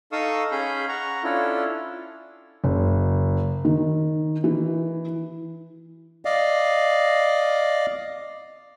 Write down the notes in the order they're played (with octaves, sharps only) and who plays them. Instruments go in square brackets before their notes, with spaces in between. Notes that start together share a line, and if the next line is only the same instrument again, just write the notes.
[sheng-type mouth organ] D#4 A4 F5 C#6 D#6 E6
C#4 G#4 F5 B5 G6
F#5 A#5 C#6
C#4 D4 E4 F4 A4
[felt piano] F#1
D#3
E3
[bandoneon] D5 D#5 F5